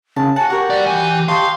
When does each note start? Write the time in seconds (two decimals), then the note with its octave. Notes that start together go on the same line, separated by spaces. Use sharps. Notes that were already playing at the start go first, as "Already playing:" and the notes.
0.16 C#3 A5
0.36 F#4 F#5 G#5 A5
0.50 F#4 G4 A#4 C#5
0.70 G3 D5
0.87 E3 G#5
1.28 G4 C#5 D#5 F5 A5 C6